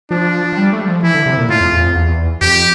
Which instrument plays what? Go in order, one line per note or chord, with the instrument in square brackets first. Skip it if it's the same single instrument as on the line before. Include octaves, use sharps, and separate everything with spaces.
[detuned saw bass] F3 [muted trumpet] D4
[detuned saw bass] F3
G3
A3
G3
F3
[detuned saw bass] E3 [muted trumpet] E4
[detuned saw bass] D3
C3
A#2
[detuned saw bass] A2 [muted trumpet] F4
[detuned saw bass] F2
E2
F2
E2
[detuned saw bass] F2 [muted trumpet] G4